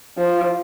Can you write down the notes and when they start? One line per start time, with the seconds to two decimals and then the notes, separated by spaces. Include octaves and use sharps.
0.18 F3